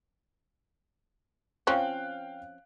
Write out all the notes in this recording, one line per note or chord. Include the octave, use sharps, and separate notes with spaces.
F3 C4 C#4 F5 G5 F#6